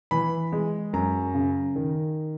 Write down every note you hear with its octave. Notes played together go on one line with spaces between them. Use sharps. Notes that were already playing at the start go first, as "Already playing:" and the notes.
E3 B5
G#3
F#2 A#5
C#3
D#3